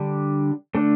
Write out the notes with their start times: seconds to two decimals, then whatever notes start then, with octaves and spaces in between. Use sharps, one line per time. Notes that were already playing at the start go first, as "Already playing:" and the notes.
Already playing: D3 G3 D4
0.75 D3 A3 D4